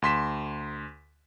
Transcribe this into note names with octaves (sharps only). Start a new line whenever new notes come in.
D2 C6 B6 E7